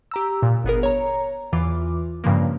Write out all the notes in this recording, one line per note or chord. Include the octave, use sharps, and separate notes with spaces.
G4 A#5 E6
A#2
G1 B3 G#4 A#4
C#5 A#5
E2 E3 F4 D6
G2 C#3 F3 G#3 A#3